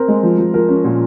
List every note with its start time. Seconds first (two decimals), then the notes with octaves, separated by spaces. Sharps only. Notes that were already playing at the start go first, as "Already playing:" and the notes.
Already playing: C4 A#4
0.08 G#3
0.23 F3
0.38 F3
0.54 F3 A#4
0.69 C#4
0.85 A#2